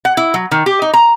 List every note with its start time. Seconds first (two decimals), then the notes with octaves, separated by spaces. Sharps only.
0.05 F#5
0.17 E4
0.34 F#3
0.51 D#3
0.66 G4
0.82 D#4
0.94 A#5